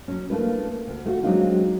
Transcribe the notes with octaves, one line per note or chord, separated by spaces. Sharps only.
F#3 C#4
A3 A#3 D4 E4 F4 B4
D2
A3 F4 F#4
F#3 G#3 C4 D4 D#4 F4